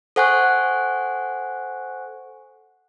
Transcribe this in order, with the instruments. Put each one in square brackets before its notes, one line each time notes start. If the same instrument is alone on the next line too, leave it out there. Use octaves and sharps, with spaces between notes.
[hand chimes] A4 C5 F#5 G#5 C#6 F#6